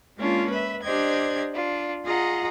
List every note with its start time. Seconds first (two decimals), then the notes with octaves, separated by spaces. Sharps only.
0.18 G#3 A#3 C#4 D4 F4
0.52 B4 E5
0.83 D4 G4 C5 D5 D#5 G#6
1.55 D4 F4
2.06 F4 G#4 D#5 F#5 A#5